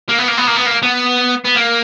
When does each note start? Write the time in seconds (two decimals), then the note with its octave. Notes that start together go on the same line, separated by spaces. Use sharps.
0.09 A#3
0.18 B3
0.28 A#3
0.38 B3
0.47 A#3
0.56 B3
0.66 A#3
0.83 B3
1.44 B3
1.55 A#3